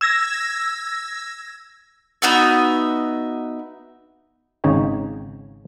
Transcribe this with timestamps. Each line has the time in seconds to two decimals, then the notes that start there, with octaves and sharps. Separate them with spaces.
0.01 E6 G#6 A#6
2.22 B3 D#4 F#4 E5
4.64 G#1 C#3 D#4 C#5 G5